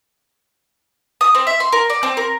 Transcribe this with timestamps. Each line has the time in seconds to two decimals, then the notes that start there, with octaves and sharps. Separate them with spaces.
1.21 D#6
1.35 C4
1.47 E5
1.60 C6
1.72 A#4
1.90 D5
2.03 C4
2.17 A#4